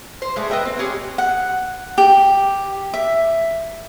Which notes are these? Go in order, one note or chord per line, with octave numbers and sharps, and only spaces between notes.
C5
G#3 A3 D4
B4 D#5 E5 G5
C4
C#4 G4 G#4
F#5
G4
E5